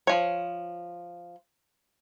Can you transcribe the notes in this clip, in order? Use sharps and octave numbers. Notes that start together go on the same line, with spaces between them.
F3 C#5